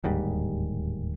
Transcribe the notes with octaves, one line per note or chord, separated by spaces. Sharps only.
D1 D#2 G#2 G3